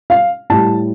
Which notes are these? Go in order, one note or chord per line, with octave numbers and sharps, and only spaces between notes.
F5
A2 G3 A5